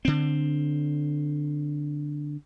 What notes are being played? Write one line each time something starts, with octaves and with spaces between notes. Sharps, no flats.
D3 C4